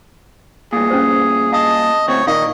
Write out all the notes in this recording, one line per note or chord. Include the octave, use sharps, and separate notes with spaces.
G2 A#2 G#4
C#4 C5
D#5 F5 A5 D#6
D2 C4 C#5
A#2 D#3 D#5 F5 C#6